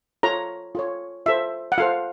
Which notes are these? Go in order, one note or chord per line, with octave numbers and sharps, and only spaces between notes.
F4 A4 C#5 A#5
F4 A4 C#5
F4 A4 C5 E5
F#5
F4 A4 C5 F5